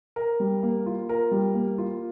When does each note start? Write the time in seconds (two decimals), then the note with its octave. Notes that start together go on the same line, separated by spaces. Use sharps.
0.16 A#4
0.40 G3
0.63 A#3
0.86 F4
1.09 A#4
1.31 G3
1.54 A#3
1.78 F4